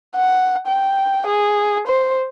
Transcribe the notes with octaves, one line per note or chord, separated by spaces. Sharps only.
F#5
G5
G#4
C5